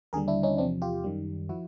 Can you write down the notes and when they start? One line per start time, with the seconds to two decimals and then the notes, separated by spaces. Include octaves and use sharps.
0.13 D#2 D3 G3 G#4 A#4
0.28 D4 E4
0.43 C#4 D#4
0.58 E2 C3 F3 C4 D4
0.82 F4 G4
1.04 F#2 D#3 G3
1.49 F3 E4 F#4